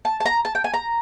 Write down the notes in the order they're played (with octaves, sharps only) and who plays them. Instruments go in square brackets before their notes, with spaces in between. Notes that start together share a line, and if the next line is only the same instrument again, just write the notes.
[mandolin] A5
A5
A#5
A5
G5
G#5
A#5